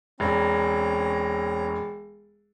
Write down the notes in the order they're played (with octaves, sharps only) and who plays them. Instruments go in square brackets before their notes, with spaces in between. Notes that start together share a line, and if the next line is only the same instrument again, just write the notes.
[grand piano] E1 [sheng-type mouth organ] C4 C#4 A#5